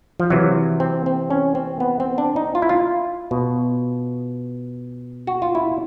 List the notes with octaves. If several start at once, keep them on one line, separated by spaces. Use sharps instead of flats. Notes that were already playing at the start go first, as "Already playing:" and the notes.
F3
C3 E3 F#3
C4
C4
C#4
C4
B3
C4
D4
D#4
F4
E4
F4
B2
F#4
F4
E4